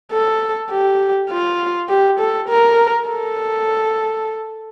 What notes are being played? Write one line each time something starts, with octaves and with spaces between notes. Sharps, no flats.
A4
G4
F4
G4
A4
A#4
A4